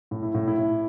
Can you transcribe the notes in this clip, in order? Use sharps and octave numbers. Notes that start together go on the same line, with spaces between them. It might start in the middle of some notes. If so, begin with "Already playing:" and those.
A2
E4
A2
E4
A2